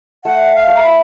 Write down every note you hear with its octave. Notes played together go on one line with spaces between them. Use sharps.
A3 F#5
F5
A3
A#5
B5